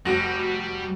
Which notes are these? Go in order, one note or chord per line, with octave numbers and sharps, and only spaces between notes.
F1 G3 F#4 A#6